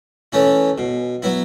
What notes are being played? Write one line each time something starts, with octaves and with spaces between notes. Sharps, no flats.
E3 A3 C#4 E4
B2
F#3 B3 E4